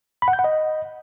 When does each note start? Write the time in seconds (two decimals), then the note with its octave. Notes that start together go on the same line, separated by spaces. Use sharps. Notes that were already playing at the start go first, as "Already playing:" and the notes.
0.22 B5
0.28 F#5
0.33 G6
0.39 F#5
0.44 D#5